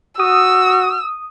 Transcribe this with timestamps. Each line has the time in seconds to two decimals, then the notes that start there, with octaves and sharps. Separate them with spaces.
0.20 F#4 D#6 E6